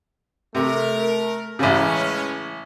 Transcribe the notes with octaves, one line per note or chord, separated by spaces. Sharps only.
C3 A3 A#4
A1 C#3 E3 G#3 C#4